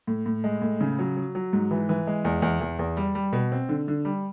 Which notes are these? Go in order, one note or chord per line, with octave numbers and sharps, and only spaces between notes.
A2
A2
G#3
A2
C#3
F#3
F#3
F#3
G#2
E3
E3
G#3
E2
E2
E2
E2
G3
G3
B2
C4
D3
D3
G3